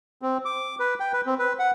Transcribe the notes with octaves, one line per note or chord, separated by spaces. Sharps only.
C4
D6
B4
G5
B4
C4
B4
F#5